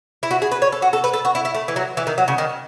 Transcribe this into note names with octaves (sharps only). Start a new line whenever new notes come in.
E4
F#4
G#4
B4
C#5
A4
F#4
A4
B4
A4
F#4
E4
E4
A3
E3
F#3
E3
D#3
F#3
C#3
D#3